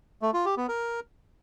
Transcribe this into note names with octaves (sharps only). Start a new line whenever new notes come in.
A3
F4
G4
B3
A#4